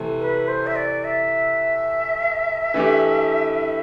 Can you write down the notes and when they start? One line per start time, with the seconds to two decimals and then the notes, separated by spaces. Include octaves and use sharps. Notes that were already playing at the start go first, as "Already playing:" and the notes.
Already playing: C3 E3 A3
0.19 B4
0.48 C5
0.66 E5
0.75 D5
1.04 E5
2.74 E3 A3 D4 G4